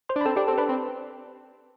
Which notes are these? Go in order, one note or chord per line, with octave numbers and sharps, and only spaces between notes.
C5 C6
D4
B5
C4 A4 A5
D4 G4 G5
C4 A4 A5
D4 B4 B5
C4